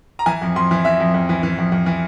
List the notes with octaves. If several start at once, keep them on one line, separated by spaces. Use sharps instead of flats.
A#5
E3 G#5
F2
F2 C6
E3
E3 E5
F2
F2
E3
E3
F2
F2
E3